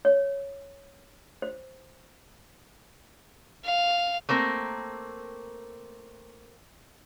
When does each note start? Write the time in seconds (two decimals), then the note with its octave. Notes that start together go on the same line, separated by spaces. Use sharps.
0.05 C#5
1.42 C5
3.65 F5
4.29 A3 A#3 C4 A#4